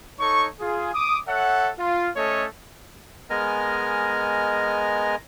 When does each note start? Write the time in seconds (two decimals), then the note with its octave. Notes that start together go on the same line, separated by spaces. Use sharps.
0.20 D#4 A4 C#5 C#6
0.60 F4 G#4
0.94 D6 D#6
1.28 A4 C#5 E5 F#5
1.79 F4
2.16 A3 C#4 A4 C#5 D#5
3.30 G#3 B3 A#4 D#5 G#5 F6